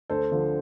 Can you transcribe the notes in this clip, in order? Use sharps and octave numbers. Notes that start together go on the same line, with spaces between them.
D2 A4 C5
D3 F3